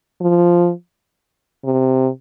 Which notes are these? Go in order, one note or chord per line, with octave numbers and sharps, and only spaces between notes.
F3
C3